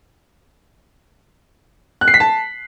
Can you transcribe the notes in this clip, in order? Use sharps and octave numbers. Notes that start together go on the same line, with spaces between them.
F#6
C7
B6
A5